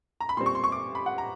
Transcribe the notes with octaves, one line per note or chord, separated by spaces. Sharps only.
A#5
B5
A#2 G3 C4 C6
C#6
C6
C#6
D6
B5
F#5
A#5